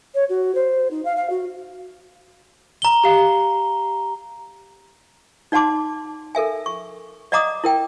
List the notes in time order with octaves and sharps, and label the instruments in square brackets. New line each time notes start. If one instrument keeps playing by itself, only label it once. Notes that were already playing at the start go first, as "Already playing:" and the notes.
[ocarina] C#5
F#4
C5
D#4
F5
F5
F#4
[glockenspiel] A#5 G7
[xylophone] G4 F5
[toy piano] D#4 D5 F#5 A5 C6 D6
A4 A#4 E5 G#5
C#6
D5 D#5 F#5 A#5 D6 D#6
E4 A#4 G5